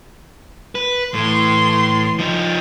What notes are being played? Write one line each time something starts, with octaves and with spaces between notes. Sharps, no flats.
B4
A2 E3 C6
F3 D#4